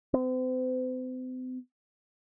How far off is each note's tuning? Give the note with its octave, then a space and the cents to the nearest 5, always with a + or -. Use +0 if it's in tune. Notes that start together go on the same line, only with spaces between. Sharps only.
C4 -40